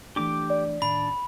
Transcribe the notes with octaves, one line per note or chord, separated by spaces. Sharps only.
E3 A3 D4 G4 D6
D5
A2 D#3 D4 B5